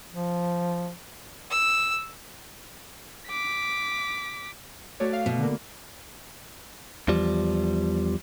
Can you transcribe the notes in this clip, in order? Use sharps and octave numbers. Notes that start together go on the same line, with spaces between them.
F3
E6
D6 B6
A3 F#4 C#5 D5
F5
B2
D3 A#3
E2 F3 G3